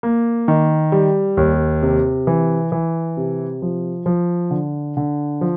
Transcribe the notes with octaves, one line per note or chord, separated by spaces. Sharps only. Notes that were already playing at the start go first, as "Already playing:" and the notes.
A#3
D#3
G3
D#2
C3
E3
E3
C3
F3
F3
D3
D3
F3